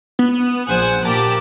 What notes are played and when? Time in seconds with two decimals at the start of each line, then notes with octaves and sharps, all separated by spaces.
0.19 B3
0.67 A#1 C5 F#5 G#5 F#6
1.05 A#2 G4 A#4 D5 A5